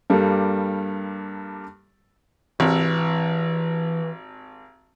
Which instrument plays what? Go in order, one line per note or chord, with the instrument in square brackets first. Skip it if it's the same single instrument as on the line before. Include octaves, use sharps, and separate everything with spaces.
[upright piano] G2 G3 A#3 G4 A4
[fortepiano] G#1 C3 [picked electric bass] E3